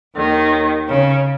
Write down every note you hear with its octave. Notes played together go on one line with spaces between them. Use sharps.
D#2 D#3
C#3